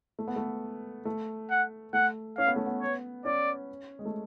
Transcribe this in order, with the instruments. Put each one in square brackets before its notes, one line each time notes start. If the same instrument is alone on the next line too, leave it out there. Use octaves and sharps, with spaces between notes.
[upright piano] A3
B3
A3
A3
[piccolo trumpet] F#5
[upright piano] A3 [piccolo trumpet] F#5
[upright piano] C#4 [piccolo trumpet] F5
[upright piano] B3
A3
B3
[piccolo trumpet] C#5
[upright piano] C#4 [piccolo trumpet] D5
[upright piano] G#3
A3